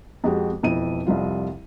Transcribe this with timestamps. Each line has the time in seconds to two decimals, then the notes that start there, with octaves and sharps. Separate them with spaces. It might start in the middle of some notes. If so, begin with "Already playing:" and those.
0.24 F2 G#3 F#4 G4
0.63 E1 F2 E4 D#7
1.07 C2 F2 G3 F4